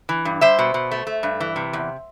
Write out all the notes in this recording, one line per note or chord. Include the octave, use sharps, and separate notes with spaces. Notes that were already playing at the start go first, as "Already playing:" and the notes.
E3
G2
G3 C5 E5
B2
B2
A3
A3
G2
E3
C3
E2